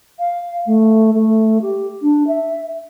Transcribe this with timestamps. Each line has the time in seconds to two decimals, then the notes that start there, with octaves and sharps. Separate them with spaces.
0.19 F5
0.66 A3
1.13 A3
1.61 G4
2.02 D4
2.27 E5